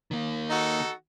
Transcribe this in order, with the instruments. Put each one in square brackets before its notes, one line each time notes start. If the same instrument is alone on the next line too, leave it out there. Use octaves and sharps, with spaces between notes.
[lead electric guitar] D#3 A#3
[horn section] D#4 F#4 A4